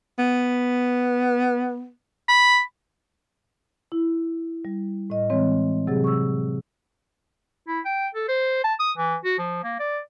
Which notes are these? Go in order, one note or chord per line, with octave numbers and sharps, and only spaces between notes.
B3
B5
E4
G3
A2 D#5
E3 G#3 C4 C#5
C3 F#3 C4 G4 G#4
C#6 E6
E4
G5
A4
C5
A5
D#6
E3
F#4
F3
A#3
D5